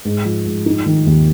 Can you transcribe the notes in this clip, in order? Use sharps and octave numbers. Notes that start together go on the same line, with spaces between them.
G#2
F3
G#2
D#4
D#3
D#2